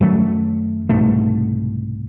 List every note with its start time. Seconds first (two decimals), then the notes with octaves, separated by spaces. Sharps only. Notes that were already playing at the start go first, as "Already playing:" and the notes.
0.01 F#2 D#3 F#3 A3
0.89 C2 G#2 B2 A3